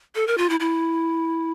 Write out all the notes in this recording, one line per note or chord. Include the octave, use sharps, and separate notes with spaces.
A4
A#4
F4
E4
E4